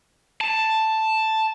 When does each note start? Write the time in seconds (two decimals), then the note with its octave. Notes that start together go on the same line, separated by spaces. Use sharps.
0.41 A5